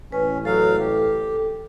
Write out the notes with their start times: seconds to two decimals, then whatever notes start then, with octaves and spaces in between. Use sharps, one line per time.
0.12 A1 C#4 B4
0.45 F#3 A4 F5
0.79 G4